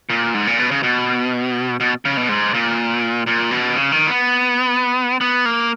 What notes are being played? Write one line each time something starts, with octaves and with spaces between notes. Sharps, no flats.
A#2
G#2
A#2
B2
C#3
B2
B2
C#3
B2
G#2
A#2
A#2
B2
C#3
D#3
B3
B3
A#3